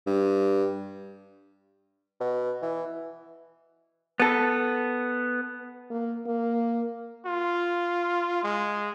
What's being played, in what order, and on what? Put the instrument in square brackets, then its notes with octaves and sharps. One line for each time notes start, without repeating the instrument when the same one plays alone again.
[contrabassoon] G2
[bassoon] B2
E3
[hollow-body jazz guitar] B3 A4
[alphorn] A#3
A#3
[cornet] F4
G#3